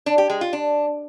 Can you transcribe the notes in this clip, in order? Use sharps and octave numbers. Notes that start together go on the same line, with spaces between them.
D4
G4
G#3
F4
D4